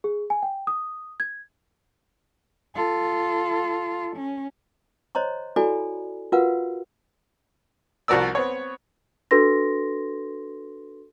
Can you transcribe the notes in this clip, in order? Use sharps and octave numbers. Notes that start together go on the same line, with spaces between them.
G#4
G#5
G5
D#6
G#6
F4 A4
C#4
C5 C#5 D#5 A#5 C6
E4 F#4 A4 D5 G#5 B5
F4 F#4 A#4 B4 F5 F#5
C2 F3 F#4 A#4 D5 E6
B3 C4 C#5
D4 F#4 A4 B4 C6 A#6